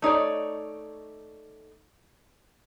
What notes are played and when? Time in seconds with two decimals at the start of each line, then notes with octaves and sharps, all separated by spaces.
0.02 A3 D#4 C#5 D5